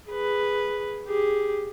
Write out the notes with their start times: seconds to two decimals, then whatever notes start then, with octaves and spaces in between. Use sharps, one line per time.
0.10 G#4 B4
1.08 G4 G#4